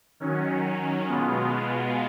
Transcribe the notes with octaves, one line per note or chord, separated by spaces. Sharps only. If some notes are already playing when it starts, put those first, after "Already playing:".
D#3 F#3 C#4
B2 G#3 B3 F4